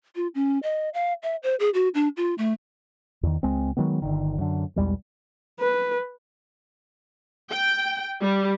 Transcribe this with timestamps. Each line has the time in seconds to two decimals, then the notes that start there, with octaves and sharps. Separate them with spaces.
0.16 F4
0.35 C#4
0.63 D#5
0.94 F5
1.23 E5
1.43 C5
1.60 G#4
1.74 F#4
1.95 D4
2.17 F4
2.38 A3
3.23 E2 D#3
3.43 C#2 G#3 C4
3.77 D#3 F#3 G#3 B3
4.02 G1 D3 D#3
4.38 F#2 D3
4.76 B1 E2 G3 G#3
5.60 B4
7.50 G5
8.20 G3